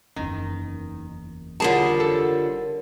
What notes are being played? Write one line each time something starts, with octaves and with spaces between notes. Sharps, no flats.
F#1 E2 D#3
D3 F3 G3 G#4 A#4 C#5 A5
A4